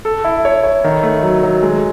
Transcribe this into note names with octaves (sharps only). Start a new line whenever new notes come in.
A4
E4
C#5
C#5
D#3
A3
F#3
F#3
G#3